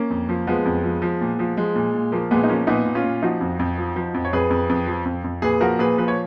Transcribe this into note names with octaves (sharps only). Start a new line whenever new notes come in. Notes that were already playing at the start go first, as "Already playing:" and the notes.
Already playing: A#3 C#4
F2
F3
F3 G#3 B3
F2
F3
F3
A#2
F3
F3 G#3
A#2
A#2
F3 A#3
A#2 G#3 B3
D#4
F3 A#3 C#4
A#2 B3 D#4
A#2
C#4 F4
A#2
F3 D#4 F#4
F2
F2
F3
F3
F2
C#5
F2 G#4 B4
F2
F2
F3
F2
F2
A#2 G#4 B4
F3 F#4 A#4
A#2 G#4 B4
F3 B4
C#5